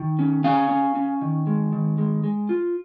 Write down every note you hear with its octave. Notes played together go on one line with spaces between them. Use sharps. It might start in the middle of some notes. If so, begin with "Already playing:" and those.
Already playing: D#3
C#4
C#4 F5 G#5
C#4
C#4
D#3
G#3
D#3
G#3
G#3
F4